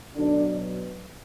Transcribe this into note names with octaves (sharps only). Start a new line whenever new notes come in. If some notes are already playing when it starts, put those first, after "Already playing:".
B2 D3 F#3 D4